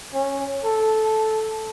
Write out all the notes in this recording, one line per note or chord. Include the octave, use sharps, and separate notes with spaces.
C#4
A4